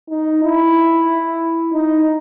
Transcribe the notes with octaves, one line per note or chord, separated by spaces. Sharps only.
D#4
E4
D#4